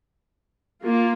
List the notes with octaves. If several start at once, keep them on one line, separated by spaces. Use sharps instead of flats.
A#3 F4